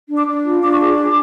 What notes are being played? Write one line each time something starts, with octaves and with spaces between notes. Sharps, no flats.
D4
D6
D4
F4
D4 D6
C#6
G#4 D6
G#4